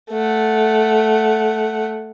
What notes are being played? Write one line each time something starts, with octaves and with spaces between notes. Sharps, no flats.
A3 F#5